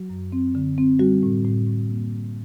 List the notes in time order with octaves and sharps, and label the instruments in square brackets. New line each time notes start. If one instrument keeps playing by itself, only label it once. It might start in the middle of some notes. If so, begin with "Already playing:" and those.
Already playing: [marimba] F#3 F#4
F#2
C4
D3
C4
G3 F#4
A2
A2
A2
A#3
G3